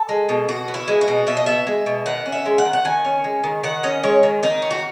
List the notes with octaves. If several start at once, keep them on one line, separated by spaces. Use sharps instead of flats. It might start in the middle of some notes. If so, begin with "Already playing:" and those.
Already playing: A4
G#3
B2
B2 F#4
B3
E4
G#3
F#4
B2
B2 E5
D#5
B3 E5
G#3
B2
D#3 F#5
C#4
E5
G#3
F#5
D#3
F#5
D#3 G#5
C#4
G#3
D#3
D#3 F#5
C#4 D#5
G#3 C#5
D#3
D#3 D#4
C#4
F#4